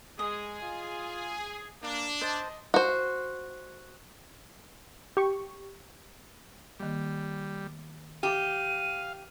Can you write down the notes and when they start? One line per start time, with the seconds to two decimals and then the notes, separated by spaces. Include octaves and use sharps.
0.19 G#3 G#4 D#5
0.62 F4
1.82 A#3 D4
2.21 C5 D#5 A5
2.74 F#4 C5
5.17 G4 C#6
6.80 D#3 G3 A#3
8.23 G4 F5 D#7